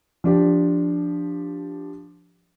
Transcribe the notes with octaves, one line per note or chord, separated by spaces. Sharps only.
F3 D4 G4